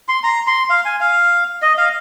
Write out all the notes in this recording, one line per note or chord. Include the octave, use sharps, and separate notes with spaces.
C6
A#5
C6
F5
G#5
F5
D#5
F5